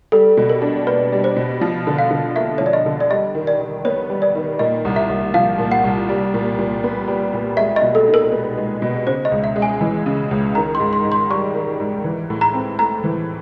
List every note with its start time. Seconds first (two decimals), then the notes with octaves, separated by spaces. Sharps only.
0.12 G3 A4
0.37 B2
0.50 A#4
0.62 D4
0.87 A#3 B4
1.12 G3
1.24 C5
1.37 B2
1.61 F3
1.87 D3
1.99 F5
2.11 D3
2.36 A#3 E5
2.58 F3 C#5
2.66 D5
2.73 D#5
2.86 D3
3.00 D5
3.10 G3 D#5
3.35 D#3
3.47 D5
3.60 D#3
3.85 B3 C#5
4.10 G3
4.22 D5
4.35 D#3
4.59 A#2 D#5
4.85 C2
4.96 E5
5.09 C2
5.34 F3 F5
5.59 A#2
5.72 F#5
5.84 C2
6.09 G3
6.34 A#2
6.58 A#2
6.84 B3
7.08 G3
7.33 A#2
7.57 G#3 E5
7.76 D#5
7.82 B2
7.95 A4
8.08 D#4
8.14 A#4
8.32 B3
8.57 G#3
8.82 B2
9.07 C#3 C5
9.25 D#5
9.32 C#2
9.44 E5
9.56 G#3
9.62 G#5
9.81 E3
10.06 C#3
10.31 C#2
10.55 D#3 A#5
10.75 C6
10.80 G#2
10.93 C6
11.05 G#2
11.12 C6
11.30 G3 C#6
11.55 D#3
11.80 G#2
12.04 E3
12.30 A2
12.41 A#5
12.54 C4
12.79 A3 A#5
13.04 E3